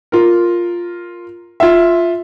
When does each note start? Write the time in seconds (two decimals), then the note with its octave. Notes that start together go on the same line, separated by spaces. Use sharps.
0.12 F4 A#4
1.60 F4 E5